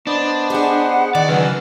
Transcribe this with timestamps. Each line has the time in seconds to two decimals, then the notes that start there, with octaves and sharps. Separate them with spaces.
0.07 B3 D4 C5 D#5
0.50 G4 G#4 F#5
1.15 D#3 E3 D5
1.29 C#3 F#3 B4 G#5 E6 F6